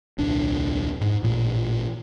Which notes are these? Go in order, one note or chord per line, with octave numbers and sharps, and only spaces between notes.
D#1 C2 D4
G#2
A1 A#2